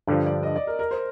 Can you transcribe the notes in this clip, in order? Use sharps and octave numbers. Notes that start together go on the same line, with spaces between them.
G2 D3 F3 D5
D5
D#5
D5
A#4
A#4
C5